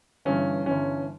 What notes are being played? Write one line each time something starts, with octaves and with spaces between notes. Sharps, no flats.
G1 G2 E3 C#4
G1 G2 E3 C#4